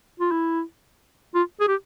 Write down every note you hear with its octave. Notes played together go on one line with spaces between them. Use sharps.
F4
E4
F4
G#4
G4